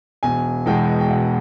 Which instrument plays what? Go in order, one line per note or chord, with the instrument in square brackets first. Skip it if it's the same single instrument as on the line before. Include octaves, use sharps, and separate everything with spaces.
[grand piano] E1 G#5
E2 B2 G#3 G5
G5
E1 F#5